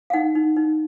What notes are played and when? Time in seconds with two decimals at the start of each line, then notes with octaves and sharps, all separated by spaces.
0.10 F5
0.13 D#4 F#5
0.35 D#4
0.56 D#4